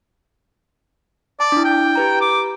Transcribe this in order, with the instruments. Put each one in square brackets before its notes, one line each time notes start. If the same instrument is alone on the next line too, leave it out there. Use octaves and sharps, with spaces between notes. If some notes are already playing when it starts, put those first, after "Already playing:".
[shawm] D5 [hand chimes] A5
[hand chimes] D4 E4
[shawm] G5
[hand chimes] G4 B4 A#5
[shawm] D6